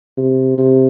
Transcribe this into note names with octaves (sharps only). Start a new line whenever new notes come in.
C3
C3